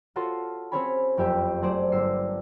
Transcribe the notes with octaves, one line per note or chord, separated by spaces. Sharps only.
F4 F#4 A4 C#5 A5 C6
C4 C#4 G#4 C#5 G#5 B5
F#1 F2 G4 E5
F#3 A3 G#4 C5 D5
G1 E6 C7